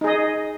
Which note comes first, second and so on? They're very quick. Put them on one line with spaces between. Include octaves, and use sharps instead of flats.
D#4 G#4 D#5